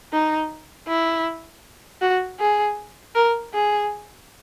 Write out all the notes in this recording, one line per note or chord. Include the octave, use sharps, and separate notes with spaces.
D#4
E4
F#4
G#4
A#4
G#4